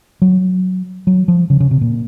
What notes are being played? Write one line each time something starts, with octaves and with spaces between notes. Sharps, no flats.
F#3
F#3
F3
C#3
C#3
C3
A#2